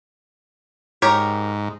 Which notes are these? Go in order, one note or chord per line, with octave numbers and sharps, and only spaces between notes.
G#2 G4 A#4 C#5